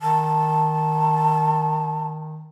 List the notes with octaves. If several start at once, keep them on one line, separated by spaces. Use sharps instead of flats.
D#3 A5